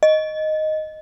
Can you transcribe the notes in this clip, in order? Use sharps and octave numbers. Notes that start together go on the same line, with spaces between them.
D#5